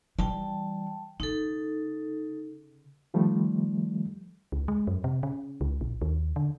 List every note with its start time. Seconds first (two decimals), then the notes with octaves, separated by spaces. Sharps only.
0.19 E3 G3 G5 A5
1.20 C#3 D#4 A4
3.14 D#3 F3 G3 A3
4.52 C#2
4.68 G#3
4.87 F#2
5.04 C3
5.23 C#3
5.61 C#2
5.81 A#1
6.02 D#2
6.36 D3